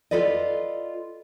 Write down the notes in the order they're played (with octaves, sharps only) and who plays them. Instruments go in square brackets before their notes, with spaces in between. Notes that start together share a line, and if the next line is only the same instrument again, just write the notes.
[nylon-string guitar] F4 A4 B4 D5 D#5